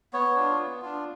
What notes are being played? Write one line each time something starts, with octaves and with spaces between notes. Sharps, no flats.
B3 C#5
D4 F4
B3
D4 F4